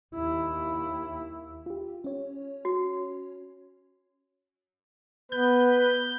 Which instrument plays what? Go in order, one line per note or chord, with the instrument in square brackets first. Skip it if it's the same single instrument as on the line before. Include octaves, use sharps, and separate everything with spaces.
[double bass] D#2 E4
[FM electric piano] F4 G4
C#4 C#5
[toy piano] F#4
[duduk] B3 [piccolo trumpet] B4 [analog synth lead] G6